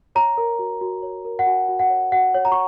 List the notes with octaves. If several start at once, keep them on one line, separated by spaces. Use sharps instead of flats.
C#5 A#5
A#4
F#4
F#4
C#5
A#4
F#5
F#4 G#5
F#4
F#5
C#5
F#4 F#5
C#5
A#5
C#6